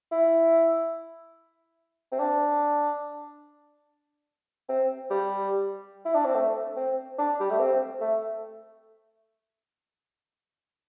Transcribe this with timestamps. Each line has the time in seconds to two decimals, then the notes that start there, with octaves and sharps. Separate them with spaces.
0.12 E4
2.12 C4
2.19 D4
4.69 C4
5.10 G3
6.05 E4
6.15 D4
6.25 C4
6.35 A3
6.77 C4
7.18 D4
7.40 G3
7.50 A3
7.59 C4
8.01 A3